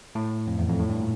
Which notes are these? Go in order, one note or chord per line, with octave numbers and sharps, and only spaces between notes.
A2
F2
E2
F2
A2
G2
A#2